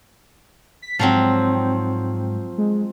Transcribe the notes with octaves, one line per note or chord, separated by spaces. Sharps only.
B6
G#2 F3 F#3 C4
G#3